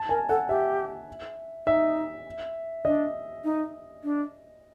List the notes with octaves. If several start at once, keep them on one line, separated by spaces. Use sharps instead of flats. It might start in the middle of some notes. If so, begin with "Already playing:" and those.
Already playing: A5
A#4 G#5
A4 F#5
G4 E5
D#4 E5
D4 D#5
D#4
D4